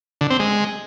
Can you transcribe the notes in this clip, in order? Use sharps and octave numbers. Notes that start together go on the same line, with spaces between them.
D3
C4
G#3